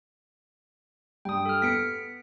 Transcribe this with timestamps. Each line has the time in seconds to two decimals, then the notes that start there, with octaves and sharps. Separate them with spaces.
1.25 G2 G5 D#6
1.46 A4 F6
1.62 B3 B6 C#7 D7